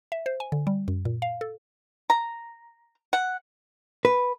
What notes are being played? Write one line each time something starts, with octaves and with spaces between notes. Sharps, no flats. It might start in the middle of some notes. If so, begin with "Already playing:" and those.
E5
C5
G#5
D3
G3
F#2
A#2
F5
A4
A#5
F#5
B4